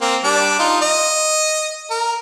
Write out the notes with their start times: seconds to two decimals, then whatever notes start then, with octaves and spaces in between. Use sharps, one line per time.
0.01 A#3 C4
0.24 G3 D4 D6
0.59 D#4 F4
0.81 D#5
1.90 A#4